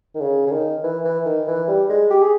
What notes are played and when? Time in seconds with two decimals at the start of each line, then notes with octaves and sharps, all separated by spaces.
0.15 D#3
0.21 C#3
0.46 C#3
0.52 D#3
0.83 E3
1.04 E3
1.25 D#3
1.47 E3
1.68 G3
1.89 G#3
2.10 G4
2.22 G#4